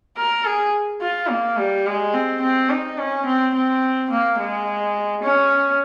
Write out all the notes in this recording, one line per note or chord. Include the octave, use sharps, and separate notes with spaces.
A#4
G#4
F4
A#3
G3
G#3
C4
C4
D#4
C#4
C4
C4
A#3
G#3
C#4